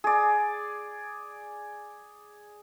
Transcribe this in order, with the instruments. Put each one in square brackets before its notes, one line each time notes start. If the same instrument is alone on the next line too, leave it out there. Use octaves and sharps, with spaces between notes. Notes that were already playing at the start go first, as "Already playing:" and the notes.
[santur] G#4 D5